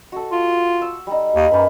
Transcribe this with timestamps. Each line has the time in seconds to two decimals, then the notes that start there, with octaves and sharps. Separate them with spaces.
0.12 F#4 A4
0.32 F4
0.82 E6
1.07 G3 D#4
1.35 D#2
1.51 F#2 A#3 B4